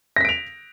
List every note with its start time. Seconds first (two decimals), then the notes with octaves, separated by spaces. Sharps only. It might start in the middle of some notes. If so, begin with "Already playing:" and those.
0.16 A#6
0.21 B6
0.25 D7
0.29 F7